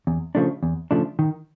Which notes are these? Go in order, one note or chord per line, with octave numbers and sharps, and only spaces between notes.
E2
C#3 F3 A3 D4
E2
C#3 F3 A3 D4
D#3